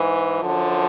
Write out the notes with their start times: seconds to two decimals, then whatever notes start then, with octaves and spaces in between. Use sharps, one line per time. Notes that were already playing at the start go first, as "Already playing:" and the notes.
Already playing: G#2 E3
0.39 F#2 D3 F3